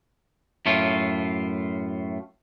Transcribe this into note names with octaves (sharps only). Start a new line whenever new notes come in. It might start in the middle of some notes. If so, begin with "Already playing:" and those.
F#2 A2 A3 F4